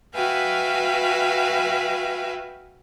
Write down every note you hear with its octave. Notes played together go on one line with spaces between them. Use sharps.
F#4 B4 E5 F5 G5 G#5